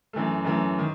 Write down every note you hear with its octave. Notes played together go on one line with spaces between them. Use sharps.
F#2 E3 A3
F#2 E3 A3
D#3